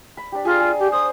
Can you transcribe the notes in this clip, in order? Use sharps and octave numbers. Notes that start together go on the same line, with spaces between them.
B5
D4 G4
F4 G#4 A#5
G#4
G4
C5 D#6